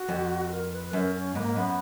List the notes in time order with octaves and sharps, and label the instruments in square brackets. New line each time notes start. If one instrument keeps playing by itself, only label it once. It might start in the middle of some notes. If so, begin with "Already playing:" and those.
Already playing: [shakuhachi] F#4
[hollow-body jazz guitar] F2
[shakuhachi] A#4
B4
[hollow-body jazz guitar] F#2 [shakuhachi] A#4
[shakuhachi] C#4
[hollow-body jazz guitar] G#2 [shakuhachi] A#3 B3
[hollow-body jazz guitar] F#2 [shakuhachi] B3